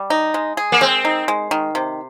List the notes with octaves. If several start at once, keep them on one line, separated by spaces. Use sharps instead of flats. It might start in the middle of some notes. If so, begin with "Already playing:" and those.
Already playing: G3
D#4
G#3
G#4
A#3
G#3 C4
D#4
G#3
D#3
C3